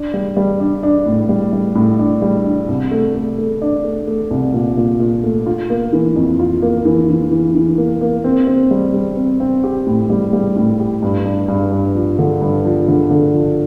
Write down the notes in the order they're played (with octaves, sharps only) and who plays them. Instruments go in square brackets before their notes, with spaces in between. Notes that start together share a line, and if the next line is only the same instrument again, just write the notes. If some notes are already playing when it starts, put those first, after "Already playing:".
Already playing: [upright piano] D4
G3
G3
D4
D4
A2
G3
G3
A2
D4
G3
D4
C2
A3
A3
A3
D4
A3
A3
C2
A#2
A#2
A#2
A3
F4
A#3
E3
F2
F4
A#3
E3
E3
E3
E3
A#3
A#3
C4
C4
G3
G3
C4
C4
G4
A2
G3
G3
A2
G4
G2
G2
G2
G2
F3
D3
G2
F3
D3
D3
F3